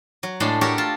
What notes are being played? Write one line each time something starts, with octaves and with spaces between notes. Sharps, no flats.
F#3
A2 G#3 D4 A5
F#4 G4 A4 A#4 C#5 D5
F4 A5